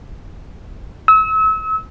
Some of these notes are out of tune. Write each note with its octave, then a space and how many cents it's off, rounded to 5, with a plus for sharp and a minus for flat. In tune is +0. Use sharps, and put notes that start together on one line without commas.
E6 -35